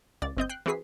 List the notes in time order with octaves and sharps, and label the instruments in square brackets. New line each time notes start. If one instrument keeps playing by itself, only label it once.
[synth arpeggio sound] C#2 D5 A6
G1 C4 D#5 G6
G5 F#6 C7
E3 C4 F#4 G#4 B6 C7